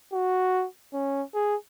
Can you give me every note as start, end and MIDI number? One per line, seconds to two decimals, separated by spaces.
0.13 0.66 66
0.94 1.23 61
1.34 1.56 68